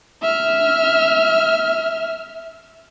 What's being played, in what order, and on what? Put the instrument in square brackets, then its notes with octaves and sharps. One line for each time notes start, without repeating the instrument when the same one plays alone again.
[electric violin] E5 F6